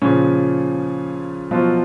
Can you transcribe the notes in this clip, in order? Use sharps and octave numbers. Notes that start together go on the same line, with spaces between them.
A#2 C#3 F3 C#4
B2 F3 F#3 F4